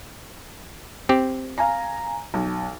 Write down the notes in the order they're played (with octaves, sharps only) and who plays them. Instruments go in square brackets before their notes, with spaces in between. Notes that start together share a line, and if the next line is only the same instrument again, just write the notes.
[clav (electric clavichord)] C4 G4
[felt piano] F5 G#5 A#5
B1